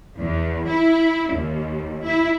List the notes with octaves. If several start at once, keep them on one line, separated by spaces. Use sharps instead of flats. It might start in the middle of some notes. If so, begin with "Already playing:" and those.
E2
E4
D#2
E4